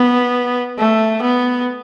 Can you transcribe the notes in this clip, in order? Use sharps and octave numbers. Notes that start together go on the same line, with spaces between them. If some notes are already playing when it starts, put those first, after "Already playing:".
Already playing: B3
A3
B3